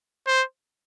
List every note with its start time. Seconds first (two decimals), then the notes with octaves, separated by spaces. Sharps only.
0.27 C5